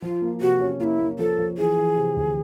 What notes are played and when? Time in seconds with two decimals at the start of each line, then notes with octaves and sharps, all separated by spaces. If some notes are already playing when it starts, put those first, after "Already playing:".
0.02 F3 F4
0.22 A#3
0.41 C3 F#4
0.60 C#4
0.80 A#3 E4 F4
0.99 A#3
1.19 F3 A4
1.38 F3
1.57 E3 G#4
1.78 E3
1.96 C3
2.16 D2